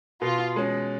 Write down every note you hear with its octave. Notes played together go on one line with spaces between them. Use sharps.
B2 F4
G#3 C#4